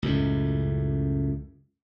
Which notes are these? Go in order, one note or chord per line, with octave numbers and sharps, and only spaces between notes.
C#2 F#2 A2